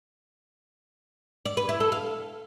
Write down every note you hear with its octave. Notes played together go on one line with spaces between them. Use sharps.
D5
B4
E4
A4
F5